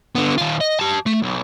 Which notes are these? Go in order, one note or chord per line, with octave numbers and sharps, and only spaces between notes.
D3 B3
D#3 F4
D#5
G4 A5
A3
B1